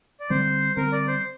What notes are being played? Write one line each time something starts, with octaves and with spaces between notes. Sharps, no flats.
D5
D3 G3 C4 C5
D3 G3 C4 A#4
D5
C5